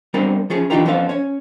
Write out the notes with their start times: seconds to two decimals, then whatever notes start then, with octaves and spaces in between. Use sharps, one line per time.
0.14 G3 B3 C4 D4 A#4 C5
0.50 F3 C#4 G#4
0.70 E3 D4 D#4 F4 G4 A#4
0.85 F2 B3 C#4 A4 C5 F5
1.09 C#4 C#5